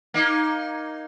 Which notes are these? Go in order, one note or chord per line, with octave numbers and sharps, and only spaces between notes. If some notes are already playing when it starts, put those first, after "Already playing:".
A#3 D#4